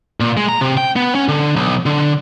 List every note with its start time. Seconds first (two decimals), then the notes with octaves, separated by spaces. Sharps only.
0.20 A#2
0.37 G#3
0.49 A#5
0.61 C3
0.77 G5
0.96 B3
1.15 C#4
1.29 D3
1.56 B1
1.86 D3